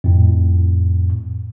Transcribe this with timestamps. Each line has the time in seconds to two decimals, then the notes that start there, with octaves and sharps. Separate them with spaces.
0.04 F2 A2